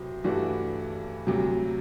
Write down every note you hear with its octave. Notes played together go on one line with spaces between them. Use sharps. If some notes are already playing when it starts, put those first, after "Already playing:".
Already playing: C2 B2 F#3 C4
G2 E3 A3 D4 F#4
D2 C3 F#3